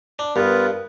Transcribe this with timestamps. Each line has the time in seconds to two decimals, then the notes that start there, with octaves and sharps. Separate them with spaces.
0.19 D4
0.36 G2 B3 F4 A#4 B4